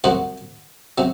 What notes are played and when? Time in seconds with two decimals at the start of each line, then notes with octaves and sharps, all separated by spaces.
0.04 C2 C3 F#3 F#4 F#5
0.98 C3 F#3